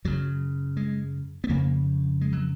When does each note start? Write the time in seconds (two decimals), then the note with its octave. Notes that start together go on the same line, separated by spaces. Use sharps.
0.05 F#2 C#3 F#3
0.77 G#3
1.44 B3
1.49 F2 C#3 A#3
2.21 G#3
2.33 F#3